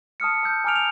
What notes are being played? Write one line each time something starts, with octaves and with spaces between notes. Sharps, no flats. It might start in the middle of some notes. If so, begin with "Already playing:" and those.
A5 D#6 F6 C#7
A5 E6 G6
G#5 A#5 D6 F6 D7 F7
F7